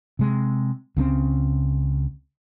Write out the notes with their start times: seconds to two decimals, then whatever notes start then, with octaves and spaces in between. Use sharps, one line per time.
0.19 C3 G#3
0.97 C#2 C#3 A3 C4